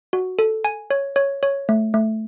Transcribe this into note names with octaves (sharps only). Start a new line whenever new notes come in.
F#4
A4
G#5
C#5
C#5
C#5
A3
A3